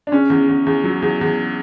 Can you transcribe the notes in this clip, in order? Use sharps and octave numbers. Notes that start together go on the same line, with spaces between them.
D4
C#3 C#4
E2
E2
E2
F#3
E2
E2